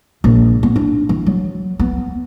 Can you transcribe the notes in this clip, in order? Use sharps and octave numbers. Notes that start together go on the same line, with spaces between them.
A#1
B3
D4
E3
F#3
B3